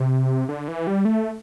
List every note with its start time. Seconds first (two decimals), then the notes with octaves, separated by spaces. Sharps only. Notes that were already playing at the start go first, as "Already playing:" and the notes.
Already playing: C3
0.49 D3
0.68 E3
0.87 G3
1.05 A3